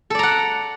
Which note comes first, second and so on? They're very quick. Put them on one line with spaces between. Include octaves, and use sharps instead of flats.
A4 D5 A#5 F#5